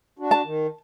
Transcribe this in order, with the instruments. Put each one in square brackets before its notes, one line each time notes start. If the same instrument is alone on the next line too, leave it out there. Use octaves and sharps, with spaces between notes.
[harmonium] D4 F#4
[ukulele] A5
[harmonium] D#3